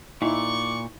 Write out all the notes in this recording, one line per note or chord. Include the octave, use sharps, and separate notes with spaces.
A#2 D#4 E4 D5 C#6